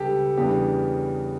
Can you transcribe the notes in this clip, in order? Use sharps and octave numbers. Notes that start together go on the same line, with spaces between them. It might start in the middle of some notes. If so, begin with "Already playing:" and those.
Already playing: C#2 B2 G3 B3 D4 G4 A4
E2 C#3 G3 B3 D4 G4